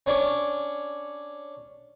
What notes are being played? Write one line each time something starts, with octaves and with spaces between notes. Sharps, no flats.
C#4 D4 C#5